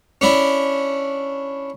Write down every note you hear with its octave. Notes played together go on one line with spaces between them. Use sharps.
C#4 D4 E4